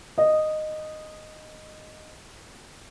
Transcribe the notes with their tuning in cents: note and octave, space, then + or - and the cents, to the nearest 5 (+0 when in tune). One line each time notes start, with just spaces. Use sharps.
D#5 -10